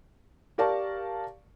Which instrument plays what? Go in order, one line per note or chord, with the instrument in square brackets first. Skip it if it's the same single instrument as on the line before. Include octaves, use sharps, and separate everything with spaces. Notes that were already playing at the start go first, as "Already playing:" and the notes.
[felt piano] G4 A#4 D5 F5 A5 C#6